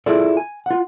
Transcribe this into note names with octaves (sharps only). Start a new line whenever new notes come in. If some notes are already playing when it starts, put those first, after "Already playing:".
E4 F4 G#4 A4 D5
G#5
F4 F#5